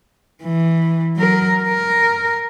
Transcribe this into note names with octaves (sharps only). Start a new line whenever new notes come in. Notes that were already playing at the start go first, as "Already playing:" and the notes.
E3
F#3 A#4
A#4